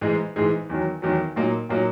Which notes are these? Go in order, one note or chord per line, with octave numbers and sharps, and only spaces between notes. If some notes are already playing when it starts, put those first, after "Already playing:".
G#2 E3 G#3 D#4 G#4
G#2 E3 G#3 D#4 G#4
E2 D#3 F#3
E2 D#3 F#3
A#2 F#3 A#3 D#4
A#2 F#3 A#3 D#4